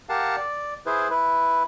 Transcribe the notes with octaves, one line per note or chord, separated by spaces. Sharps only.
G4 A#4 F5 F#5 A5
D5
E4 G#4 B4 C5
E4 B4